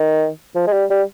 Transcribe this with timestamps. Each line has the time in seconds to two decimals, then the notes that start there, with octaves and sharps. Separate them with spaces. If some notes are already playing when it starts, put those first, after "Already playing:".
Already playing: D#3
0.55 F3
0.67 G#3
0.73 G3
0.90 G3